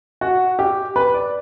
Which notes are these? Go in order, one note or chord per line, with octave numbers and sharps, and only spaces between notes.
F#4
G4
B4
D5